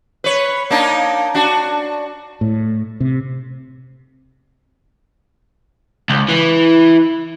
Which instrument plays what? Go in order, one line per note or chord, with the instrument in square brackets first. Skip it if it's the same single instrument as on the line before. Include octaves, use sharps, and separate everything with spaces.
[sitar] B4 C#5
A#3 D4 D#4
D4 F#4
[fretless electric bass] A2
C3
[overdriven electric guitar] C#2
E3